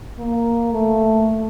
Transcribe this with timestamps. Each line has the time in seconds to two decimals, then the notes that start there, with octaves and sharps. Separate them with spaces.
0.19 A#3
0.73 A3